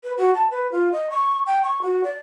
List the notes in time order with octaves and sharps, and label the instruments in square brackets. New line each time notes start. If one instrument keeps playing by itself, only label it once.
[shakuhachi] B4
F#4
A5
B4
F4
D#5
C#6
G5
C#6
F#4
D5